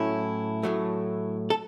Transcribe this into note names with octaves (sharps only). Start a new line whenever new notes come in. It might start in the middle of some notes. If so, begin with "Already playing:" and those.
Already playing: A2 F#3 A3 C#4 E4
A2 F#3 A3
A4